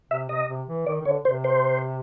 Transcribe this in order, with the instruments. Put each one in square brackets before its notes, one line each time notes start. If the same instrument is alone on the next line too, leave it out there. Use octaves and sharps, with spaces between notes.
[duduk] C3 [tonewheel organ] E5
[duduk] C3 [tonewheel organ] D#5
[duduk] C3
E3
[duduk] D#3 [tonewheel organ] D5
[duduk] D#3
[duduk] D3 [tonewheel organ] C#5
[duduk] C3 [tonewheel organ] C5
[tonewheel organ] C5